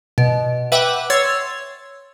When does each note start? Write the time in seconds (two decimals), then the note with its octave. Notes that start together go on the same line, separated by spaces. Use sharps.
0.18 B2
0.72 B4 E5 F#5 G5 D6
1.10 C#5 C6 E6 G#6 A6